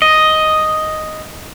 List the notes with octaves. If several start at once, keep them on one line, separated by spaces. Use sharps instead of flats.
D#5